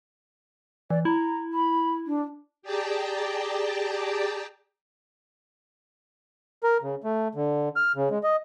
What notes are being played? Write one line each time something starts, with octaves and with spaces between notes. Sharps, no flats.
E3 D5
E4 A#5
B5
D4
G4 G#4 D5 G5 A5 A#5
A#4
C#3
A3
D3
F6
C#3
G#3
D#5